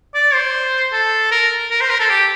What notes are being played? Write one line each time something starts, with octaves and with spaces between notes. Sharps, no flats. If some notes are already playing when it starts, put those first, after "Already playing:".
D5
C5
A4
A#4
A#4
C5
A#4
A4
G4